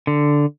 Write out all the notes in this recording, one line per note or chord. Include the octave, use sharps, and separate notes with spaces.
D3